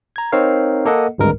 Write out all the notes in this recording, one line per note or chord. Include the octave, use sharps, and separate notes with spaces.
A#5 G#6
C4 D#4 A#4 C#5 F5
A#3 A4 D#5 F#5
G#1 D2 G2 G#3 A#4